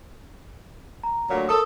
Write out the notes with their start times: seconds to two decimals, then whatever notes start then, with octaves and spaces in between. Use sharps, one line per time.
1.04 A#5
1.29 D2 A#2 F#3
1.49 A4 A#4 D#6